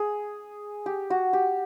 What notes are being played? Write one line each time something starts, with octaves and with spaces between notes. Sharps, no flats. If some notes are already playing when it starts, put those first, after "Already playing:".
Already playing: G#4
G4
F#4
G4